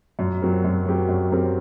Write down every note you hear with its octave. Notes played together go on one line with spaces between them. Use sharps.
F#2
F#3 C4 G4 A#4
F#2
F#3 C4 G4 A#4
F#2
F#3 C4 G4 A#4